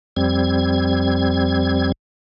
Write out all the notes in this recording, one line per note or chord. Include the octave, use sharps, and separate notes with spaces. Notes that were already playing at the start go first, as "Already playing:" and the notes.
F2 G3 C4 G#6